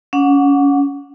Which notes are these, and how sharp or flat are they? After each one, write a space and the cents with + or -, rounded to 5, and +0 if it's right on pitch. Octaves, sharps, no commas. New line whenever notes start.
C#4 +20 F#5 -25 D6 +0